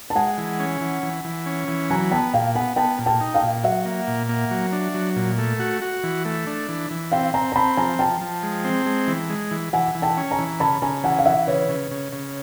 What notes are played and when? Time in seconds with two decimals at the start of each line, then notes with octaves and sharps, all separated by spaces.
0.10 A5
0.15 G#3 F#5 G#5
0.38 E3
0.60 C#4
0.81 E3
1.03 E3
1.25 E3
1.46 C#4
1.68 E3
1.90 F#3 G#5 A#5
2.11 B3 G5 A5
2.33 A#2 F5 G5
2.55 B3 F#5 G#5
2.76 B3 G5 A5
2.99 A#2
3.06 G5 A5
3.20 D#4
3.34 F5 G5
3.42 A#2
3.64 F#3 E5 F#5
3.85 A#3
4.07 A#2
4.29 A#3
4.51 F#3
4.73 D4
4.94 F#3
5.16 A#2
5.38 A3
5.60 F#4
5.82 F#4
6.03 E3
6.25 A3
6.47 D4
6.69 E3
6.90 E3
7.12 C4 F5 G5
7.34 C4 G#5 A#5
7.52 A#5
7.56 C4 A5 B5
7.77 F3 G#5 A#5
7.99 F3 G5 A5
8.21 F3
8.43 G#3
8.65 C4
8.86 G#3
9.08 E3
9.30 G#3
9.51 E3
9.73 E3 F#5 G#5
9.95 E3
10.02 G5 A5
10.17 C#4
10.31 G#5 A#5
10.38 E3
10.60 C#3 A5 B5
10.82 C#3 G#5 A#5
11.04 E3 F#5 G#5
11.19 F5
11.25 E3 E5 F#5
11.47 C#3 B4 C#5
11.69 C#3
11.91 C#3
12.13 C#3